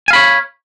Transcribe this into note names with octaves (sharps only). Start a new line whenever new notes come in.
C#5 F5 G#5 B5